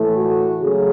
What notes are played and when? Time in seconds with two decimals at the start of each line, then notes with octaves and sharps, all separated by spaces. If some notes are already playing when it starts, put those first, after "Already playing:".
Already playing: A2 E3 A3
0.16 F#4
0.62 C#3 F#3 A3 G#4